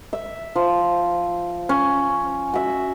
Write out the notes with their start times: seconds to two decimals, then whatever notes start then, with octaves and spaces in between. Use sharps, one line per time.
0.13 E5
0.56 F3
1.69 C#4
2.54 F#4 E5